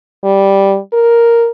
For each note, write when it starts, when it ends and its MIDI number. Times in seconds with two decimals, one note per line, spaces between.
0.24 0.78 55
0.93 1.50 70